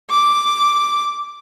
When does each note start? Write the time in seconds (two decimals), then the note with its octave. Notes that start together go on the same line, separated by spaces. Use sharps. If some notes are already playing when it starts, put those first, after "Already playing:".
0.10 D6